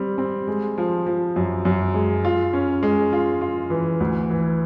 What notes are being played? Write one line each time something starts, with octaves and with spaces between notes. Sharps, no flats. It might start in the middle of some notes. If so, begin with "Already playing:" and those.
Already playing: G3 C4
C4
G#3
F3
F3
F#2
F#2
G#3
F4
C#4
G#3
F4
F4
E3
D2
E3